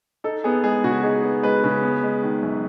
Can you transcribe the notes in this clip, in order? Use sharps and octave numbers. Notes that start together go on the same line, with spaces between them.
D#4 A4
B3 G#4
G#3 G#4
C#3 F#4
D#4 G#4
B3
G#3 B4
C#3
B3
G#3
D#3
F#2